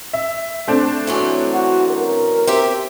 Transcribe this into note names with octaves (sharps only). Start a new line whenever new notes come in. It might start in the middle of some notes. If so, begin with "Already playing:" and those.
E5
A3 C4 D4
E3 F#3 C#4
F#4
A#4
C4 G4 E5